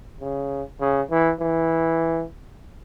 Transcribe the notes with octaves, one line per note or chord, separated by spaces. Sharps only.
C#3
C#3
E3
E3